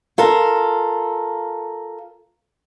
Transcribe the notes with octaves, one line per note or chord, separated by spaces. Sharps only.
F4 A4 A#4